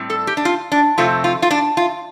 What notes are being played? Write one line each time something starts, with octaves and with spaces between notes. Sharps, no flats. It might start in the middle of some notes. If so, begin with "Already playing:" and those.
Already playing: A2 G3 C4
A4
G4
D4
F4
D4
F2 C3 A3 C4 F4
F4
F4
D4
F4